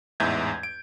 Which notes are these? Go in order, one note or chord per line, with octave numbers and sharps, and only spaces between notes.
A1 E2 G#2 E5 G6 G#6
D7